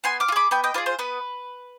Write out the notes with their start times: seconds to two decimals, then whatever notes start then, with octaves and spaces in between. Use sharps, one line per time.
0.04 B3 G#5 C6
0.20 D6 F6
0.28 F4
0.32 G#4 B5 D6
0.51 B3 G5 B5
0.64 D#5 G5
0.74 F4 G#4 B4 D5
0.86 C5
0.99 B3 B4